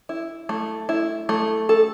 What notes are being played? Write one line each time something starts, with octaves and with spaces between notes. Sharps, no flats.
E4
A3
E4
A3
A4